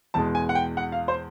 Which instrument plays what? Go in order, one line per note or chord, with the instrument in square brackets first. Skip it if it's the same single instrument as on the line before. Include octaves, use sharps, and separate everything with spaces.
[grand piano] E2 B2 G#3 A5
G#5
F#5
G5
F#5
F5
C5